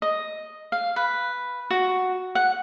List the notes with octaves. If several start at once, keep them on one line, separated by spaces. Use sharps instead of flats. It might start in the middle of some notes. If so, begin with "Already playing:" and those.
D#5
F5
B4
F#4
F#5